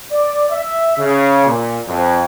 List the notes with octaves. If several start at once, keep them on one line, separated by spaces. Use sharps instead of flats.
D5
E5
C#3
A#2
F2